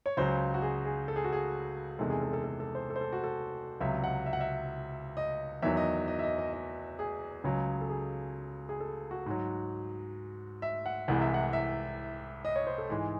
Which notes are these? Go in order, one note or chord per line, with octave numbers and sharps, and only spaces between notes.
C#5
C#2 C#3 F#3 C5
F#4
G#4
G#4
A4
G#4
F#4
G#4
E2 C3 D#3 G#3 A4
G#4
A4
A4
A4
A4
C5
A4
C5
A4
F#4
A4
C#2 C3 F#3 E5
F#5
E5
F#5
E5
D#5
E2 D#3 F#3 E5
D#5
D#5
E5
D#5
D#5
D#5
G#4
C#2 C#3 F#3
A4
G#4
G#4
A4
F#4
G#2 F#3
E5
F#5
C2 C3 E3 G#3 F#5
E5
F#5
E5
D#5
C#5
C5
A4
G#2 E3 G#3 G#4